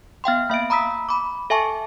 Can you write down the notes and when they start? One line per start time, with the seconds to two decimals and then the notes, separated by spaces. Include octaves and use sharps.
0.24 B3 F5 G5 C6
0.50 A#3 E5 F5 D7
0.70 A#5 B5 D#6 E6 B6
1.09 B5 D6
1.50 A4 E5 G#5 A5 C#6